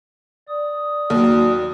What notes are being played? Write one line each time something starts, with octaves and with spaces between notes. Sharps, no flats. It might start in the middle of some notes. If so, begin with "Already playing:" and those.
D5 D#6
D#2 F#3